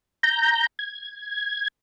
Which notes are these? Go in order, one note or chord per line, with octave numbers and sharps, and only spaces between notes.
A#5 G6
G#6